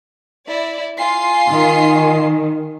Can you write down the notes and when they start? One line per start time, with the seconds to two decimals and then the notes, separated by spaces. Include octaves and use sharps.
0.47 E4 D5
0.98 F4 G#5 C6 C7
1.50 D#3